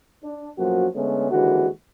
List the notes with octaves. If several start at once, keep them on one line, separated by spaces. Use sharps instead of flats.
D4
B1 F#2 F3 A#3 F#4
D3 G#3 A3 B3 C#4
D#2 D3 E3 G#3 F#4